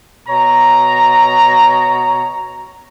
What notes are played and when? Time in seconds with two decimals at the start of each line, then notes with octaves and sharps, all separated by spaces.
0.27 B2 C#5 A#5